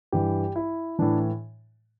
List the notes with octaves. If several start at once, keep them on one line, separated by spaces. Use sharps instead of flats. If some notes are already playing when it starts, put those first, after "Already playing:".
G2 E3 G4
E4
A2 E3 D4